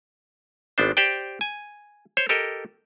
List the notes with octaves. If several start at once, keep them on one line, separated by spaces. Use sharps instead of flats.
G#1 B3 D4 C5
G4 C5 D5 G5
G#5
C5 C#5
G4 A4 A#4 D#5